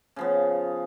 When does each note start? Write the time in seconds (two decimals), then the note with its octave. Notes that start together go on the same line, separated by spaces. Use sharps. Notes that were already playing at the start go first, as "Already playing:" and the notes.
0.16 C#3 F3 B3